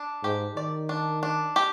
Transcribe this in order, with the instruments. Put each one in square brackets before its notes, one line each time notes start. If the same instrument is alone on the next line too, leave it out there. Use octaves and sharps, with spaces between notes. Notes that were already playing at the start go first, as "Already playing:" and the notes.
Already playing: [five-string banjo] D4
[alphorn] G#2 [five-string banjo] G4
[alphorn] D#3 [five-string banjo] D5
[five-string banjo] D4
D4
G4